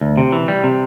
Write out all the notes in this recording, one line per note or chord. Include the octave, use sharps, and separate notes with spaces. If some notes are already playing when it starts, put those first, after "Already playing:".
D2
C3
E3
G3
C3